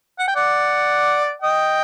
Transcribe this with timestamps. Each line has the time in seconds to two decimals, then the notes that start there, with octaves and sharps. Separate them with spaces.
0.19 F#5
0.28 G5
0.35 D5 F#5
1.42 D#5 G5